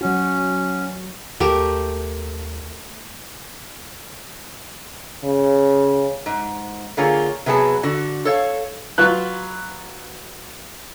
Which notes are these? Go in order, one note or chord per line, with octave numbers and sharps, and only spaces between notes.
F#3 C#4 F#4
D#2 A3 G4 A#4
C#3
G#2
D3 A#3 F4 G#4 C#5
C3 F#3 B3 G#4 A5
D3 F#4
A4 C#5 F5
F#3 F4 B4 F#6